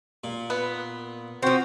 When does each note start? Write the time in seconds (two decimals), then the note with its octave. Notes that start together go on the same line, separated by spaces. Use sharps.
0.24 A#2
0.50 B3
1.43 F3 C4 F#4 C5